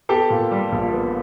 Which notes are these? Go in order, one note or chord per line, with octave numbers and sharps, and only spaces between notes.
B3 G4 A4
A#2
G3
A#1
B3